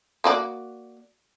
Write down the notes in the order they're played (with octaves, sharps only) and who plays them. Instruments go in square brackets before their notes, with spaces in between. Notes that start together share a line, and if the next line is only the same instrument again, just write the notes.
[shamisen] A#3 F#4 D5